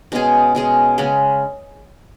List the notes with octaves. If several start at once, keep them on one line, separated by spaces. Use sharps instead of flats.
B2 G#3 C#4 G#4
B2 G#3 C#4 G#4
C#3 G#3 C#4